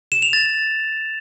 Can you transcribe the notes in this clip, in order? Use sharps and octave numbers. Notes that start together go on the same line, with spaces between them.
E7
F7
A6